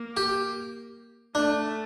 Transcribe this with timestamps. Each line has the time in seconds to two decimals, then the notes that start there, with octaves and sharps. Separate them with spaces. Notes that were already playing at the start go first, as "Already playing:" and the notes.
Already playing: A#3
0.17 G4
1.35 A3 D4